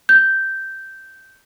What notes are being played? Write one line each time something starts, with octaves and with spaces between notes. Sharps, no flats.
G6